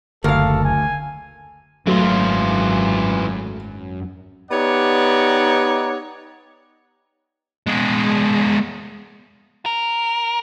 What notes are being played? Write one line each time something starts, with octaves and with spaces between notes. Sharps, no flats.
F#1 D2 A4 A#4 F5
G#5
G#1 F#2 E3 F#3 A3 F4
B3 D#4 G4 C#5 D5 F#5
G#3 B3
A#4